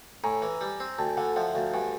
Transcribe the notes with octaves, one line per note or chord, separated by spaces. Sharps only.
A2 G#5 A#5
E3
G3
C4
D2 G5 A5
D3 F#5 G#5
F3 E5 F#5
D2 F5 G5
G2 F#5 G#5